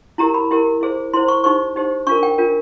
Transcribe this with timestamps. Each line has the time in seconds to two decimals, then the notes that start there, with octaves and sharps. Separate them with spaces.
0.18 E4 G4 A#4 A#5
0.34 B5
0.51 E4 G4 A#4
0.81 E4 G#4 C5
1.13 E4 G#4 C5 C6
1.28 C#6
1.44 D#4 G4 C5 C#6
1.76 D#4 G4 C5
2.07 D4 F4 A#4 C#6
2.23 G5
2.38 D4 F4 A#4